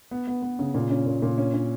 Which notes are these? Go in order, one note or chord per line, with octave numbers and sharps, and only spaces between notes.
B3
B3
B3
C#3
A#2
C#4
A#2
A#2
C#4
C#4